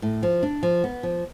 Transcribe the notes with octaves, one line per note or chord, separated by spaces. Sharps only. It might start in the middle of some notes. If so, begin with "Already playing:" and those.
A2
F3
D4
F3
B3
F3